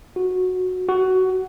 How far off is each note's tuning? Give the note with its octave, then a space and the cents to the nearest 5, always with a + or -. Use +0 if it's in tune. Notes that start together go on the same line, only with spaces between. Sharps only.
F#4 -10
F#4 +15